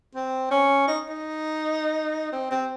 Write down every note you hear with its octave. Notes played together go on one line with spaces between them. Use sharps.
C4
C#4
D#4
D#4
C4
C4